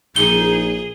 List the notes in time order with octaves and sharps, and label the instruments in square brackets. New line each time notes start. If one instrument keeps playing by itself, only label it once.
[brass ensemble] A#1 [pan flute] D#4 [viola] G#4 [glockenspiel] G7